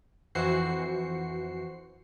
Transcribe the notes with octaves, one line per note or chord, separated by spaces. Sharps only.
F2 E3 F#4 C5 C7 C#7